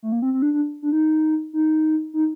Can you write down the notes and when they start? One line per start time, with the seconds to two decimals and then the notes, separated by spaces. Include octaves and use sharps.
0.03 A3
0.12 A#3
0.22 C4
0.33 C4
0.42 D4
0.53 D4
0.82 D4
0.92 D#4
1.53 D#4
2.14 D#4